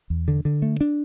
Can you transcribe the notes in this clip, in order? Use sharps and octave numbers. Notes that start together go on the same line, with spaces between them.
E2
D3
D3
A3
D4